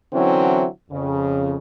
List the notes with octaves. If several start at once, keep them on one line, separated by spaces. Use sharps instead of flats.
D3 E3 F#3 C4 C#4 E4
F2 C#3